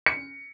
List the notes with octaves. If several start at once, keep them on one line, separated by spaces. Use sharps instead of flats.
C#7